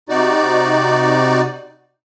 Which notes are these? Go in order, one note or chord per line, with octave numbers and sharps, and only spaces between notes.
C3 D#4 F#4 D5